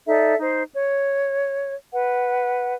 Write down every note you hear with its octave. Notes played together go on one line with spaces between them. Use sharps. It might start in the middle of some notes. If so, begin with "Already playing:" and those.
D#4 A4 D5 E5
D#4 C5
C#5
B4 F#5